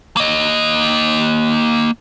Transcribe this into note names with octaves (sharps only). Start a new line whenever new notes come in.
A#3 D#5